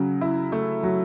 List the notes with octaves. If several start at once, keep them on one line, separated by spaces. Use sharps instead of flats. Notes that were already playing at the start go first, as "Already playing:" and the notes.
Already playing: C#3 F#3
E4
A3
F#3